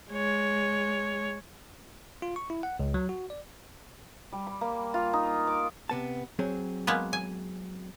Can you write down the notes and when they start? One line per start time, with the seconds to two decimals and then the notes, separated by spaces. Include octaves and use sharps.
0.11 G#3 C#5
2.22 F4
2.36 C#6
2.50 E4
2.63 F#5
2.79 C#2
2.94 F#3
3.09 F#4
3.30 D5
4.32 G3
4.47 B5
4.61 A#3
4.94 F4
5.13 D#4
5.47 D6
5.89 C3 B3 A5
6.39 F#3 C4 G#4
6.87 G#3 A#3 B3
7.13 G#5